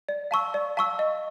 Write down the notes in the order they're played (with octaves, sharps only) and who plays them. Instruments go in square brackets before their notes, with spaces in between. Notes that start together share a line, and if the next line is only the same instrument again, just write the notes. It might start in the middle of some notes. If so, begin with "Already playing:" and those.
[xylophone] D5
F5 A5 C#6 E6
D5
F5 A5 C#6 E6
D#5